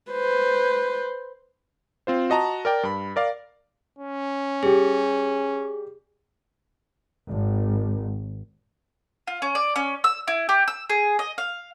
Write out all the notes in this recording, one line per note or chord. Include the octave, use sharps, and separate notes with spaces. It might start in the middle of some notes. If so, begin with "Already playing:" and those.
B4 C5
C4 F4 C5
F#4 D#5 A5 A#5
A#4 D5 G5
G2 B5
A#4 D5 F5
C#4
G3 G4 G#4
G#1
F4
C#4
D5
C#4
E6
E4
G4
E6
G#4
D#5
F5